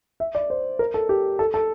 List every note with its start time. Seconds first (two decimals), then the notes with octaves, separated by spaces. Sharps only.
0.20 E5
0.35 D5
0.50 C5
0.79 A#4
0.94 A4
1.09 G4
1.39 A4
1.54 A4